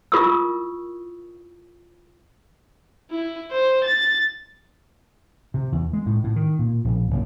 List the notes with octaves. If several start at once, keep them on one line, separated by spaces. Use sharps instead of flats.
E4 F4 A#4 C#6 D#6 E6
E4
C5
A6
C3
E2
G#3
A2
A2
D#3
A#2
A#1
F#1